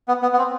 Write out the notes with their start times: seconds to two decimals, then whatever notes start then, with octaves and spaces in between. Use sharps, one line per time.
0.08 B3
0.22 B3
0.33 B3
0.38 C4